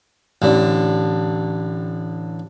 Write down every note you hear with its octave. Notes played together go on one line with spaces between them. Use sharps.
A1 D3